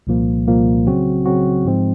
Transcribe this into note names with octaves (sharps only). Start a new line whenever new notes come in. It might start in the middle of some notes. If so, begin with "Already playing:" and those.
C2 A#2 F3 A#3
C2 A#2 F3 A#3
C#3 F#3 C4 F#4
C#3 F#3 C4 F#4
G#2 F3 G#3 C4